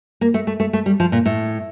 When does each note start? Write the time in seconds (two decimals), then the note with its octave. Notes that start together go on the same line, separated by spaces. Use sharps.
0.21 A#3
0.34 A3
0.47 A3
0.60 A3
0.73 A3
0.86 G3
1.00 F3
1.12 A#2
1.26 A2